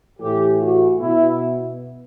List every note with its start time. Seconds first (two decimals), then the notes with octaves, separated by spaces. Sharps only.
0.19 A2 E3 G4
0.60 F#4
1.00 B2 E4